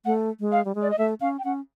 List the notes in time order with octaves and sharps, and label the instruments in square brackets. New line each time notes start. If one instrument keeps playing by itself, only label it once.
[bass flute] A3 [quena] F#5
[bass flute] G#3
[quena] F5
[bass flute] G3
G#3
[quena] D5
D#5
[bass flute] A3 [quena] E5
[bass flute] C#4 [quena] F5
[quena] G5
[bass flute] C#4 [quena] F#5